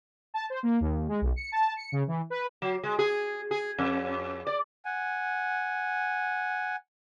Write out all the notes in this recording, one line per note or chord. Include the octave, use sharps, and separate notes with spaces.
A5
C5
A#3
D#2
G#3
B1
C#7
A5
C#7
C#3
E3
B4
F#3
G#3
G#4
G#4
F2
D5
F#5 G#5